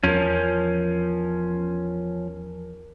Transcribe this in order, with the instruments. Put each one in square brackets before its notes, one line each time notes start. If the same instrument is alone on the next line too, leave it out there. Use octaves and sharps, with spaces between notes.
[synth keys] E2 A#4 [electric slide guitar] F3 C#4